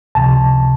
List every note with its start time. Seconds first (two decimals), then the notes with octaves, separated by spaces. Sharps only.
0.15 C#2 C3 F3 A5